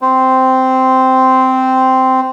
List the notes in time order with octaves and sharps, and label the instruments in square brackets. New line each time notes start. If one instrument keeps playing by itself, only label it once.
[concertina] C4 C5